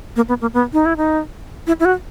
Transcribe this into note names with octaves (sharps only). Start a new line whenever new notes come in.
A#3
B3
A#3
B3
D#4
E4
D#4
E4
E4
F#4